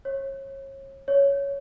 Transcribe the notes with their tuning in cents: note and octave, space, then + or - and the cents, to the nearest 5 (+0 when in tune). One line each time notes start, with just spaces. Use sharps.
C#5 -30
C#5 +10